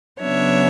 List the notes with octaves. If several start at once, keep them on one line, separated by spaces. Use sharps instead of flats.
C#3 F#3 B3 D4 C#5 E5